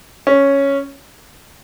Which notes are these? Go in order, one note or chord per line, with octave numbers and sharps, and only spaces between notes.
C#4